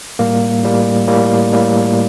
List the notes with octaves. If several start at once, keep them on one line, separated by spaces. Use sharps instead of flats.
A2 G3 A#3
A2 G3 A#3
A2 G3 A#3
A2 G3 A#3